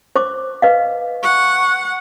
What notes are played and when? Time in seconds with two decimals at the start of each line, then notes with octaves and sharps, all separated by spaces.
0.16 C5 C#6 D6
0.62 B4 D#5 F5
1.23 F#5 C#6